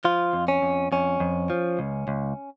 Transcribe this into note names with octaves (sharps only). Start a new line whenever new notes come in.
F3 F4
F2
C#4
F2
F2 C#4
F2
F3
C#2
C#2